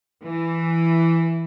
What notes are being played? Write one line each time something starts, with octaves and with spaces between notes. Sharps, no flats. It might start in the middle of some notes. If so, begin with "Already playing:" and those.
E3